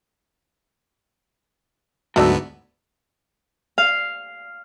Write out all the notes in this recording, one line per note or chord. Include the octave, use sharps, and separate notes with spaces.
D2 G#2 F#3 A3 B3 D4 E5
F5